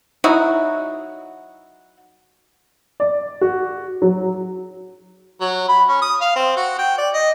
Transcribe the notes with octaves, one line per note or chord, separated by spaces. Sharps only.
F#3 D#4 E4 F#4
D5
F#4
F#3
F#3
B5
C#4
D#6
F5
C4
F#4
G5
D5
D#5